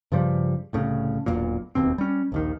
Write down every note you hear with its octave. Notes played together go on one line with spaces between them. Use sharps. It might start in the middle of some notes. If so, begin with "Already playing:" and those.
G2 C#3 F3 G3
C2 A2 C#3
E1 B1 E2 A#2
E1 D#2 B2 C4
G3 C#4
A#1 D#2 D#3